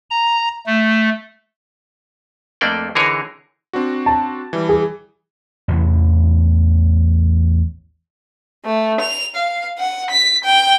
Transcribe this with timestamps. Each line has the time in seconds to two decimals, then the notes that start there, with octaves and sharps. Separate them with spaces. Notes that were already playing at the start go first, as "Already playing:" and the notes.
0.10 A#5
0.66 A3
2.61 F2 A3 A#3 D4 D5 G5
2.95 D3 E3 D#4 G#4 A#4 C#5
3.73 C4 D4 F#4
4.06 A5
4.53 E3 G3
4.69 G#4
5.68 A1 E2 C3 E3
8.65 A3
9.00 F7
9.35 F5
9.78 F#5
10.10 B6
10.44 G5